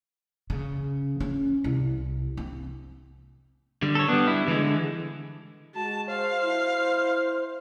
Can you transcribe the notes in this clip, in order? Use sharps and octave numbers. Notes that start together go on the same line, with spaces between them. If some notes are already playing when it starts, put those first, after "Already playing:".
C#3
C#4
C2
C4
D3 G3
A4 C#5
G3 B3 D4
E4
D3 E3 G#3
G#3 F#4 A5
C5 F5
E4